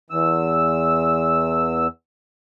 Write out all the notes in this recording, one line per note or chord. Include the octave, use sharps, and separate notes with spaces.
E2 E6